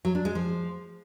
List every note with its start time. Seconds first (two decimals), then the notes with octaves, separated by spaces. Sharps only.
0.05 F#3
0.15 D4
0.25 G#3
0.35 F3